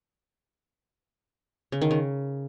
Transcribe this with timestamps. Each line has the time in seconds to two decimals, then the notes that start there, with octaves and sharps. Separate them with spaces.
1.72 C#3
1.82 D#3
1.91 C#3